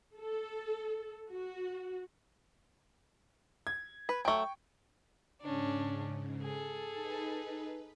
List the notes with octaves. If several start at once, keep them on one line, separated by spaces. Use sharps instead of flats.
A4
F#4
G#6
B4
F#3 A3 G5 C#6
G#2 C#3 C#4 D4
G#4 A4
D#4 B4